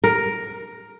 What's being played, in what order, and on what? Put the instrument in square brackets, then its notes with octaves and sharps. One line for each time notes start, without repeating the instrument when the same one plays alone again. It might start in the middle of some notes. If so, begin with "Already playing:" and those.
[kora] A#4